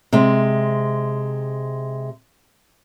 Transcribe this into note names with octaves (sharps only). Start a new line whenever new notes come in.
C3 G#3